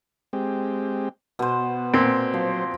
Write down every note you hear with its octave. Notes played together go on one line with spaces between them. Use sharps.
G#3 C4 G4
B2 B3 C5
A#2 C4
F3 F#3 C5